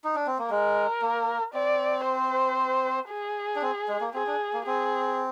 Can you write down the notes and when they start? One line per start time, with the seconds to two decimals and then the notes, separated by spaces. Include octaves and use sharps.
0.04 D#4
0.15 D4
0.27 C4
0.39 A#3
0.50 G#3 A#4
1.02 A#3
1.54 C4 D5
2.06 C5
3.10 G#4
3.56 D4
3.62 C4
3.88 G#3
4.01 A#3
4.14 C4 G#4
4.27 D4
4.53 A#3
4.66 C4 G#4